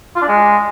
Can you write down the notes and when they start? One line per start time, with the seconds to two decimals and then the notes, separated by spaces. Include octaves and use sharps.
0.16 F4
0.22 D4
0.28 G#3